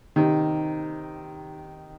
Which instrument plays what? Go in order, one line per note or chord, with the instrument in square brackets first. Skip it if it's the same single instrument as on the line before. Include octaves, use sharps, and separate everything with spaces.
[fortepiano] C3 D#3